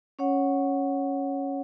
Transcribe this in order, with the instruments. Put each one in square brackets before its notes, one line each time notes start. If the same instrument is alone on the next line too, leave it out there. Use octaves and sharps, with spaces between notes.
[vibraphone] C#4 C#5 F#5